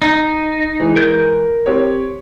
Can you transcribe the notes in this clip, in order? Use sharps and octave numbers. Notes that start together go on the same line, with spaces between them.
D#4
E3 G#3
A#4 G6
C4 G4 C#5